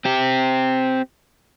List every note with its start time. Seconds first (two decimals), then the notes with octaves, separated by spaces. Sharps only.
0.05 C4 G4